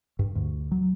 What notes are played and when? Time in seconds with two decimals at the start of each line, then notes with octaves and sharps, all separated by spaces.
0.19 G2
0.35 D2
0.71 F#3